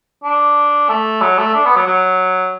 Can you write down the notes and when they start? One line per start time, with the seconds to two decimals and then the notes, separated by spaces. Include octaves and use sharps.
0.24 D4
0.89 A3
1.22 F#3
1.38 A3
1.54 D4
1.65 B3
1.76 F#3
1.87 F#3